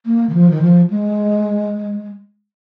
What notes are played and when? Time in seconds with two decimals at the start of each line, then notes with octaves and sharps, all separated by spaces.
0.06 A#3
0.29 D#3
0.35 F3
0.50 D#3
0.62 F3
0.90 G#3